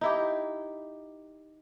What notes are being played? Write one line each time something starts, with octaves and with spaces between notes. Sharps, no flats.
D#4 E4 G4